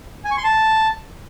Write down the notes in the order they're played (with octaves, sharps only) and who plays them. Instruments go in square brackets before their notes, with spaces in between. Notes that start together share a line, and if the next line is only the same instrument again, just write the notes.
[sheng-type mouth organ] G#5
C#6
C6
A5